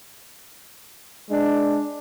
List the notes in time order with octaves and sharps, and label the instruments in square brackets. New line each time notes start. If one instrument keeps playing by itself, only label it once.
[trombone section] G#3 D4